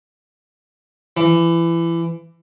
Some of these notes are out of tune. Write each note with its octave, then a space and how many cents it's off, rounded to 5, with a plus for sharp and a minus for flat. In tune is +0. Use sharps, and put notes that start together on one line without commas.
E3 +25